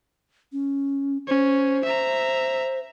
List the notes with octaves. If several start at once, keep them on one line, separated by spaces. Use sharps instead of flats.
C#4
C#4 C5
E5 A#5